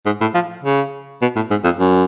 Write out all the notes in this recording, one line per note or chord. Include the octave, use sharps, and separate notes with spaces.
G#2
A2
F3
C#3
B2
A2
G#2
F2
F#2